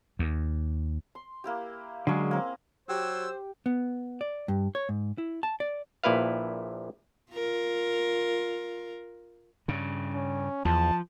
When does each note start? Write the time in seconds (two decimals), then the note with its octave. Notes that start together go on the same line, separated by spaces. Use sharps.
0.19 D#2
1.15 C6
1.44 A#3 E4 G4
2.07 D3 F#3 G#3 C#4 G#4
2.31 A#3 C4
2.89 F#3 G4 C5 E6
3.66 B3
4.21 D5
4.48 G2
4.75 C#5
4.89 G#2
5.18 E4
5.43 A5
5.60 D5
6.04 A#1 A#2 E4 B4 F5
7.33 F4 A#4
9.68 G2 C#3
10.14 C#4
10.65 E2 F3 A5